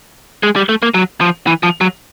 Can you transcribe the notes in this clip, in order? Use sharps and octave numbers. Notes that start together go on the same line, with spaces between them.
G#3
G3
A3
A#3
F#3
F3
E3
F3
F#3